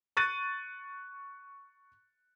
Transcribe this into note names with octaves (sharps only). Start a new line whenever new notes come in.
C#6 F#6 A6 D#7